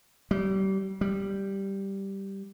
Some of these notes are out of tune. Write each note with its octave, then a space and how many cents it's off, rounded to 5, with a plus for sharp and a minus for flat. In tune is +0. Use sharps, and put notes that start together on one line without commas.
G3 -30
G3 -5